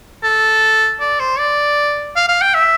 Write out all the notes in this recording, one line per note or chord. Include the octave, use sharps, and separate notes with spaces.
A4
D5
C5
D5
F5
F5
G5
E5